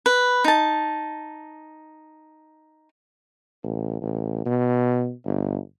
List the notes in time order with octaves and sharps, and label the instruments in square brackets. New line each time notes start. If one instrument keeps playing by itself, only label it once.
[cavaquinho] B4
D#4 A5
[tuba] A1
A1
B2
G1